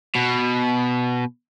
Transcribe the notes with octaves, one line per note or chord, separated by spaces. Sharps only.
B2